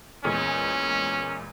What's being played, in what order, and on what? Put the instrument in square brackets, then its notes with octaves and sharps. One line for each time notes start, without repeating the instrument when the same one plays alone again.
[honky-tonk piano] E2 A#2 G#3 [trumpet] C#4